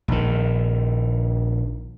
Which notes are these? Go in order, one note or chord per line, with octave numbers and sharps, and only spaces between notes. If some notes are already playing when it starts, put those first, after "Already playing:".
A#1 D#3